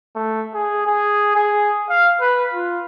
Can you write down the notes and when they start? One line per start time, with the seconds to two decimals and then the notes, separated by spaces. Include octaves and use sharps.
0.15 A3
0.54 G#4
0.87 G#4
1.36 G#4
1.90 F5
2.20 B4
2.54 F4